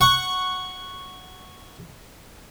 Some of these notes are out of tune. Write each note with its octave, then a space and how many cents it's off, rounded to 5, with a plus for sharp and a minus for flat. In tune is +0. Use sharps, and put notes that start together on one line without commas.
F#5 +0 C#6 -5